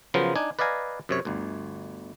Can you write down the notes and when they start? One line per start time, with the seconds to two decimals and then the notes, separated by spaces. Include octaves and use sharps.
0.14 C#3 F3 F#3 B3 A#4 C5
0.36 D4 D#4 G#5
0.59 B4 D5 D#5 F5 G#5 A#5
1.09 F#2 C3 C#5
1.25 G1 D2